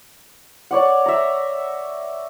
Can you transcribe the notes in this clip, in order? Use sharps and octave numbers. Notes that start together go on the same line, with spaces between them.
C#5 D5 F#5
E5 A#5